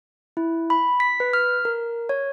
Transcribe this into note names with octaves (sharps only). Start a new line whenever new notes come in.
E4
B5
B6
B4
F6
A#4
C#5